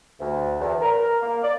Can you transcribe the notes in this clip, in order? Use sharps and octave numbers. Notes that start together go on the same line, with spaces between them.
D2
E2
A#4
A#3
D5